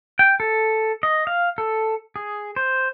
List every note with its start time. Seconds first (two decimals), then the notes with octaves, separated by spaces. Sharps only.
0.19 G5
0.40 A4
1.03 D#5
1.27 F5
1.58 A4
2.16 G#4
2.56 C5